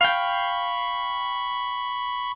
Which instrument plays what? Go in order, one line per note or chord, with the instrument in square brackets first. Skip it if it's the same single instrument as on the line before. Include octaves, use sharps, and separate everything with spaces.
[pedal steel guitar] F5 G5 [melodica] B5 C#6